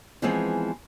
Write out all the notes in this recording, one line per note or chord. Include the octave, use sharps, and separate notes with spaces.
E3 F3 G#3 B3 C4 G#4